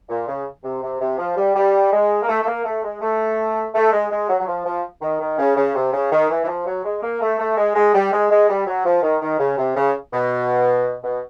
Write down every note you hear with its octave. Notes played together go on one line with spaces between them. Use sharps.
A#2
C#3
C3
C3
C3
F3
G3
G3
G#3
A#3
A3
A3
A#3
A3
G#3
A3
A3
G#3
G#3
F#3
F#3
F3
F3
D#3
D#3
C#3
C#3
C3
C#3
D#3
E3
E3
F3
F#3
G#3
A#3
A3
A3
G#3
G#3
G3
G#3
G#3
G3
F#3
F3
D#3
D#3
C#3
C3
C#3
B2
B2